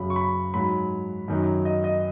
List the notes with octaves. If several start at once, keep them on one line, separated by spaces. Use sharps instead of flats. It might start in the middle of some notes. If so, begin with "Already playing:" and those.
Already playing: F#2 C#3 F#3 B5
C#6
B5
G#2 F#3 B5
F#2 D#3 F#3
D#5
D#5